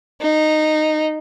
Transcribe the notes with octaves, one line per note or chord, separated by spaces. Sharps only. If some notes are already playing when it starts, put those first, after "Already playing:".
D#4